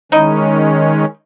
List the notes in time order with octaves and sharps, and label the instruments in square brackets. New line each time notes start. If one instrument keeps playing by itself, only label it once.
[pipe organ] D#3 G#3 C#4 [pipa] D#4 E4 D#5